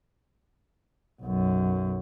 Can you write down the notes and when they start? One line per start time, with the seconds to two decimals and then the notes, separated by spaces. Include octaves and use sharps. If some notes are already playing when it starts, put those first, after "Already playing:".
1.22 B1 F#2